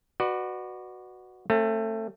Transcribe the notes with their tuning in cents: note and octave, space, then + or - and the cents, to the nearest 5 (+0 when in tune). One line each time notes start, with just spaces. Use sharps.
F#4 +0 B4 +0 D5 +35
A3 +20 C4 +45